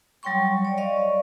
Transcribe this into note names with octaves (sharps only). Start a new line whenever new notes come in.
F#3 G3 C#5 G5 C6 C#6
C#5 D5
D5 D#5 F5 C#6